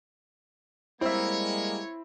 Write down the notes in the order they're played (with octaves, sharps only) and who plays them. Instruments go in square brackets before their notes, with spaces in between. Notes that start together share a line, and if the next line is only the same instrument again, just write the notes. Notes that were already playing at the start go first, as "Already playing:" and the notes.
[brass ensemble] G3 G#3 A#3 [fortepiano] C4 E5 [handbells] E4 [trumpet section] C#5